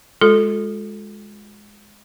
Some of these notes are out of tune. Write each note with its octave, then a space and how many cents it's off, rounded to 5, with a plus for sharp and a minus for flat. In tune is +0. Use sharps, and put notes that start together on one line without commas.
G#3 +0 F4 +45 A4 +0